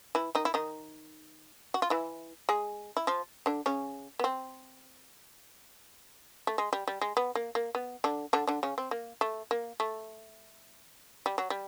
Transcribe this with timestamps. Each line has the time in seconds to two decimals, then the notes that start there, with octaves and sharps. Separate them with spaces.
0.15 E3 E4
0.35 D#3 D#4
0.45 E4
0.54 D#3 D#4
1.74 F#4
1.82 F4
1.90 E3 E4
2.49 G#3 G#4
2.97 E4
3.07 F3 F4
3.46 D3 D4
3.66 C#3 C#4
4.19 B3
4.24 C4
6.47 A3
6.58 G#3
6.73 G3
6.88 G3
7.01 G#3
7.17 B3
7.35 A#3
7.55 A#3
7.75 B3
8.04 D3 D4
8.33 D3 D4
8.47 D3 D4
8.63 C#3 C#4
8.78 C4
8.91 A#3
9.21 A3
9.51 A#3
9.80 A3
11.26 G3
11.38 F#3
11.50 G3